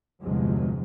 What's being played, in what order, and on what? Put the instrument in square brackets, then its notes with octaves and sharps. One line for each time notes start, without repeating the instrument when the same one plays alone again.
[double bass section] G1 E2 C3 F3 F#3 G#3